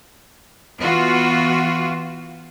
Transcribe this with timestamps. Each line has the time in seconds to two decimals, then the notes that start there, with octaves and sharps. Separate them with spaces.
0.80 E3 B3 F4 F#4